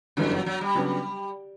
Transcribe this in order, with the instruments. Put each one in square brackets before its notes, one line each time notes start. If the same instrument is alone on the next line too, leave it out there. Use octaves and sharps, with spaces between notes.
[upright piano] G1 F#2 E3 G3 C#4 [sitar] D3
[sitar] F#3
F#3
G3
[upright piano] C#3 F#3 B3 D4